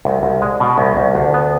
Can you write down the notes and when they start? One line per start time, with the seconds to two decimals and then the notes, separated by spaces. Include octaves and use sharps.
0.05 C2
0.23 C2
0.42 G#3
0.60 B2
0.78 C2
0.97 C2
1.15 D2
1.34 B3